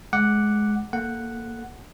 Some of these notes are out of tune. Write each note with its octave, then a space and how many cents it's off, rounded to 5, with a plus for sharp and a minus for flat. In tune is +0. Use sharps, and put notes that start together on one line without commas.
G#3 +20 F#5 +0 D6 +0
A#3 +0 A4 +0 F#5 +0